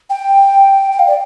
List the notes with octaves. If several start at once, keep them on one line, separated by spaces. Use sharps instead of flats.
G5
G5
F5
D5